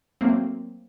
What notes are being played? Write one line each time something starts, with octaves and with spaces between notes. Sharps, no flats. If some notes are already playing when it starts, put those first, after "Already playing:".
F#3 A3 A#3 C4